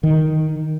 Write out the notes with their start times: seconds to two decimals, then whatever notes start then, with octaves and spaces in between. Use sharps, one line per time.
0.03 D#3